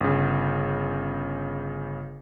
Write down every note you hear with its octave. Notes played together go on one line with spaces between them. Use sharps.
G1 C#3